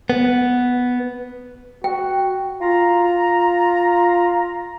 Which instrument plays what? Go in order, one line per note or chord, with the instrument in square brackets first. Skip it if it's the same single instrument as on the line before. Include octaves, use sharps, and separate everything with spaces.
[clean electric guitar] B3
[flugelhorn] F#4 [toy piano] G5
[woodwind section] F4 A#5